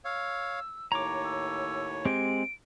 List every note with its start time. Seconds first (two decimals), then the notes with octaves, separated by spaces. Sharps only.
0.05 C#5 F5 E6
0.92 D#2 A2 C#5 A#5 D6
1.24 E6
2.05 G#3 C4 G4 D7